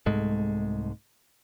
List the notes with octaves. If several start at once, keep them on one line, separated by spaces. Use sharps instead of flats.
C2 G#2 G#3 A3